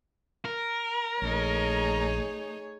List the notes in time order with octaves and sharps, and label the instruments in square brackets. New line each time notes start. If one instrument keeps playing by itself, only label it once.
[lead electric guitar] A#4
[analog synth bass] A#1 [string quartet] A3 D#4 [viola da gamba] G#4 C#5